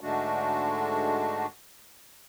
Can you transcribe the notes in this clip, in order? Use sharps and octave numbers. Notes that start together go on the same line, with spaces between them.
G#2 D3 G#3 A3 D4 F#4